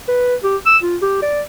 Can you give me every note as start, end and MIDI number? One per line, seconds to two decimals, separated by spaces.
0.08 0.35 71
0.43 0.57 67
0.66 0.77 88
0.83 0.96 65
1.02 1.20 67
1.22 1.42 74